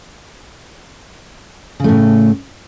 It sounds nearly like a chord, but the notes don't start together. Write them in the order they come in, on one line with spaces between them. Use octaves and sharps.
C#3 A3 A2